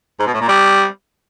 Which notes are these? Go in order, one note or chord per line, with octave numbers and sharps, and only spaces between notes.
G#2
B2
A2
A#2
G3